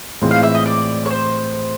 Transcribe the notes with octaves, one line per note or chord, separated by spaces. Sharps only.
A2 E3 G#3 C4 F4
F5
E5
D#5
D5
C#5
C5